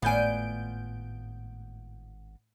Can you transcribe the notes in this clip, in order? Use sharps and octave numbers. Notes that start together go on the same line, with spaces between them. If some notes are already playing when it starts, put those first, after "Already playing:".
G#1 A2 B3 F4 D5 G#5 G6 D7